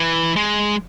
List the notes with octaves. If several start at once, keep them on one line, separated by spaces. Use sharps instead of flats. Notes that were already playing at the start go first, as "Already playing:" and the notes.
Already playing: E3
G#3